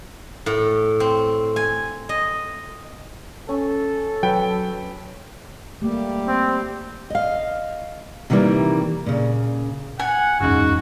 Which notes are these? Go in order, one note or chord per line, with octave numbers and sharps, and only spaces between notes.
A2
C4
G#5
D#5
C#4 A4
F#3 B4 G5
G3 A3 A#3 G4
C4
D#5 F5
C3 D#3 E3 G3 A#3
A#2 C#3
F#5 G#5
F#1 E2 G#2 C#3 F#4